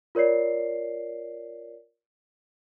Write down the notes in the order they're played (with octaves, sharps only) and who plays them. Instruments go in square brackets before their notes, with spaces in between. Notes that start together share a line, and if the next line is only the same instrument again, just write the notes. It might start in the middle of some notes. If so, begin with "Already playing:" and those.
[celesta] F4 A#4 C#5 D5 C7